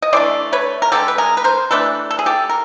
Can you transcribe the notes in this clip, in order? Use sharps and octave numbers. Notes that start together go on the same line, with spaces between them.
D#5
E3 A3 D4 C5 D5
B4 C#5
A#4
D3 F3 G#3 G4 A4
B4
G#4 A#4
B4
A#4 C5
E3 A3 D4 A4 B4
A4
G#4
G4 A4
A#4